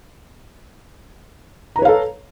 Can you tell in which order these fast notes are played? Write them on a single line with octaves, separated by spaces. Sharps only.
A#5 B4 C#5 F5 A4